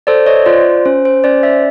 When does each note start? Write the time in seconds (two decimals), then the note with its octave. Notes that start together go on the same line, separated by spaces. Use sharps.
0.07 A4 C5 D5
0.26 C#5 D#5
0.46 F4 C5 D5
0.85 C#4 C5
1.05 C5
1.24 C#4 C5 D5
1.43 D5 E5